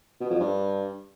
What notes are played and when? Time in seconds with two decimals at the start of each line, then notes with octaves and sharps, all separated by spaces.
0.20 B2
0.30 F2
0.40 G2